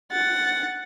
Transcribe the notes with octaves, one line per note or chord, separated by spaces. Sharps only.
F#5 A6